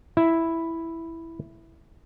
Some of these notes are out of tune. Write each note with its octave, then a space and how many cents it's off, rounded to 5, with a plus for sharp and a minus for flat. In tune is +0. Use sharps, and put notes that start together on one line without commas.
E4 +0